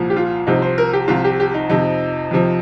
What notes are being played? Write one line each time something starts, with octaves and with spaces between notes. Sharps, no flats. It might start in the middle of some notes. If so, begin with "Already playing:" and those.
Already playing: C2 A#2 F3
G4
F4
C2 C3 F3 D#4
C5
A#4
G4
C2 C3 F3 F4
G4
G4
D#4
F2 C3 F3 D#4
F2 C3 F3